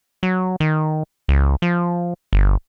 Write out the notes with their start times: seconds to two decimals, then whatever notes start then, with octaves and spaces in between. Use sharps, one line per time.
0.23 F#3
0.60 D#3
1.28 C#2
1.62 F3
2.33 G1